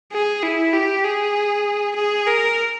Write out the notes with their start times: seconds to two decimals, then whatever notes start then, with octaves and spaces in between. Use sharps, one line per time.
0.12 G#4
0.42 E4
0.73 G4
1.04 G#4
1.95 G#4
2.27 A#4